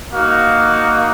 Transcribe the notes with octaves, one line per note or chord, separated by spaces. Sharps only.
A#3 D#4 F#4 F5